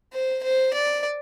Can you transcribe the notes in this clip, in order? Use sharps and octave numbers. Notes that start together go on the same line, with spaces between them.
C5
C5
D5